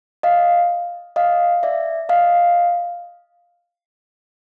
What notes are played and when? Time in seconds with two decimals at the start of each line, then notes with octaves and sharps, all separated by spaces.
0.23 D#5 F5
1.16 D#5 F5
1.63 D5 E5
2.09 D#5 F5